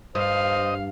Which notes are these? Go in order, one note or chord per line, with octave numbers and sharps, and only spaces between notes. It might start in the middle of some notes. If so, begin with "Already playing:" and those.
G2 C5 D#5 F5